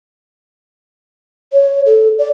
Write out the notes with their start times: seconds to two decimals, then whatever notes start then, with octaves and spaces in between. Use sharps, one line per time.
1.53 C#5
1.86 A4
2.19 D5